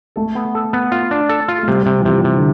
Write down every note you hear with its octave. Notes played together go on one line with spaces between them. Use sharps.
A3 A4
B3
A4
B3
F4
D4
A4
F4
A3
C3 G3
C3
E3
C3 F3
C3
D3